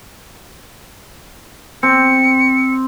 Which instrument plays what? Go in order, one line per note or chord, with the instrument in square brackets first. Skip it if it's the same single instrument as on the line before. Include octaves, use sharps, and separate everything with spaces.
[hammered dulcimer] C4 [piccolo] C#7